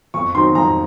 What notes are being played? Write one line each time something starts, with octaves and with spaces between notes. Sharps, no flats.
F2 C#6
D#3 F#3 C4 D#4 C6
F2 A#5